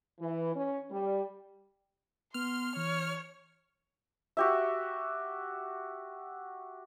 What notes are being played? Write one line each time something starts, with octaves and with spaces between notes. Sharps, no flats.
E3
C#4
G3
B3 C6 F6
E3 C#5
F#4 G4 E5